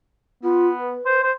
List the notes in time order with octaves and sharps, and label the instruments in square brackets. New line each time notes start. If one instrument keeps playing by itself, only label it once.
[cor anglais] B3 [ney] F4
[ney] B4
[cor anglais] C5
C5